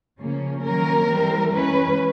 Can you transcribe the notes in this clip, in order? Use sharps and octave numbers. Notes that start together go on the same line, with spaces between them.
C#3 F3 A#3 C#4
D#3 F#3 A#3 C#4 A#4
E3 G3 C4
E3 G#3 C#4 B4